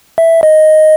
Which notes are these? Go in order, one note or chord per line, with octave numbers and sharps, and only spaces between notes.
E5
D#5